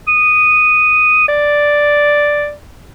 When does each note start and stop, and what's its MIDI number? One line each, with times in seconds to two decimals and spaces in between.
0.08 1.23 87
1.28 2.52 74